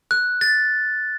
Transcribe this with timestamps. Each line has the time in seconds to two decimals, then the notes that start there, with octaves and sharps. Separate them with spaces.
0.11 F#6
0.41 A6